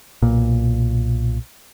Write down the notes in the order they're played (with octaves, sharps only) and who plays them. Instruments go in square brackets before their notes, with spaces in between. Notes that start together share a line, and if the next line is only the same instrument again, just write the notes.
[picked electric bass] B1 A#2